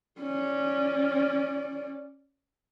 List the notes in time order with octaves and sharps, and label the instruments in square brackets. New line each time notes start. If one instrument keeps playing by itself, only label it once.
[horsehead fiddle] C#4 D5